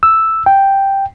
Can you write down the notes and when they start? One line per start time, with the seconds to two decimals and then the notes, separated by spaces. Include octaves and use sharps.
0.03 E6
0.46 G5